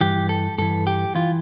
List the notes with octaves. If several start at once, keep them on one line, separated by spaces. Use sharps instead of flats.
G2 E3 G4
A4
G2 E3 A4
G4
E3 F4